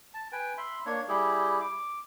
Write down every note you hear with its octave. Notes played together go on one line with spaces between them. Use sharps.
A5
B4 G5 G#5
E5 B5 C6
A#3 D4 C#5
G3 E4 G4 G#4
D6